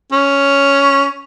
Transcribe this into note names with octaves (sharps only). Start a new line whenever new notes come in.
C#4